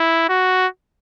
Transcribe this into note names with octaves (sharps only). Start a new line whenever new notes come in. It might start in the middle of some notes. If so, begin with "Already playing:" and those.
Already playing: E4
F#4